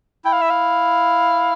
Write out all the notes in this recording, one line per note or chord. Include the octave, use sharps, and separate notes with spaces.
E4 G5
F5
E5
F5